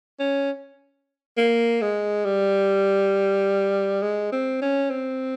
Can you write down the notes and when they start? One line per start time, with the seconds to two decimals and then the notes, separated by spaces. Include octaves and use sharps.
0.20 C#4
1.38 A#3
1.82 G#3
2.25 G3
4.02 G#3
4.32 C4
4.61 C#4
4.90 C4